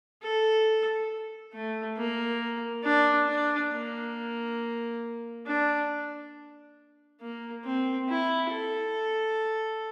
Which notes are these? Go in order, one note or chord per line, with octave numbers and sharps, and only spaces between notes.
A4
A3
A#3
D4
D4
A#3
D4
A#3
C4
E4
A4